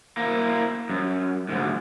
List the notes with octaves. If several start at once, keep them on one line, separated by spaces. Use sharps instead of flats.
A#3 E4
F#2
D2 G#2